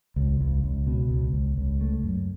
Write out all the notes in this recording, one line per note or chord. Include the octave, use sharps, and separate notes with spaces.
C#2
C#2
C#2
B2
C#2
C#2
C#2
A3
F#2